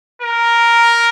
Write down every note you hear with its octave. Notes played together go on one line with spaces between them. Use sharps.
A#4